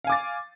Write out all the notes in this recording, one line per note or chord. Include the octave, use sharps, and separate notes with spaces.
F5 G#5 D6 A6